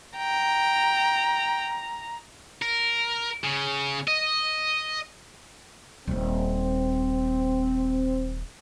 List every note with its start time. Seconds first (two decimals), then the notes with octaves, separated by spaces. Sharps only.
0.17 G5 A#5
2.62 A#4
3.44 C#3
4.08 D#5
6.07 D#1 D#2 C4